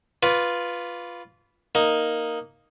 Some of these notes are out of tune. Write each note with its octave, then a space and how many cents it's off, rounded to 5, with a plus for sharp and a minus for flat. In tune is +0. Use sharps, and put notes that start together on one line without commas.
F4 +0 B4 +0 D5 -40
A#3 +0 D#4 +0